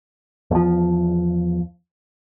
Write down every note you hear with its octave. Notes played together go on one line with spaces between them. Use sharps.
E2 F3